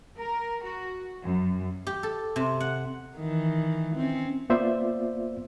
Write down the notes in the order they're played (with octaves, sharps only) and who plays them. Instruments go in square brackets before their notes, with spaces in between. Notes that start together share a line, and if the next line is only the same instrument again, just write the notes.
[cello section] A#4
F#4
F#2
[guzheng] G4
A4
C3
F#5
[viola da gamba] D#3 E3
C4 C#4
[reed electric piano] A#3 B3 F4 C5 D5 E5